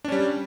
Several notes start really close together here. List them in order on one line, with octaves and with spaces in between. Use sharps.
D4 C#4 G3